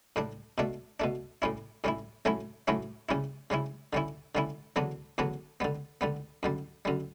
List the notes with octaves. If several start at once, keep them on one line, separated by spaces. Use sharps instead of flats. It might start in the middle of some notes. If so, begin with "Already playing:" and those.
A2 G3 D4
B2 A3 D4
B2 A3 D4
A2 G3 C#4 E4
A2 G3 C#4 E4
A2 F#3 A3 C#4 E4
A2 F#3 A3 C#4 E4
C#3 G3 C#4 E4
C#3 G3 C#4 E4
D3 G3 C#4 E4
D3 G3 C#4 E4
E2 D3 F#3 B3 D4
E2 D3 F#3 B3 D4
D3 G3 B3
D3 G3 B3
F#2 D3 G3
F#2 D3 G3